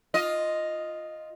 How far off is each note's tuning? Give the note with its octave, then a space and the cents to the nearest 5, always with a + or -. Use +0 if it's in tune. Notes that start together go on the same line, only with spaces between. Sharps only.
F4 +0 D#5 +0